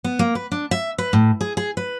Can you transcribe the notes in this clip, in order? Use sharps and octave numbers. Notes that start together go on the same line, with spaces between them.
B3
A#3
B4
D4
E5
B4
A2
G#4
G#4
B4